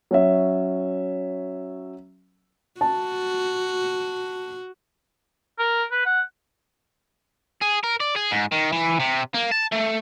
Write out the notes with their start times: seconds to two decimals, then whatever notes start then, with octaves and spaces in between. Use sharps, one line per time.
0.11 F#3 C#4 E5
2.81 F#4 A5
5.59 A#4
5.91 B4
6.06 F#5
7.62 G#4
7.84 A#4
8.00 D5
8.16 G#4
8.31 G#2
8.52 D#3
8.72 E3
9.00 C3
9.34 A#3
9.51 A5
9.72 A3